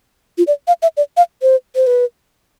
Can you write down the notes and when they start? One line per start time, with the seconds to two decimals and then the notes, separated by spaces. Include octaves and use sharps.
0.38 F4
0.47 D5
0.68 F5
0.82 E5
0.97 D5
1.17 F5
1.42 C5
1.76 C5
1.87 B4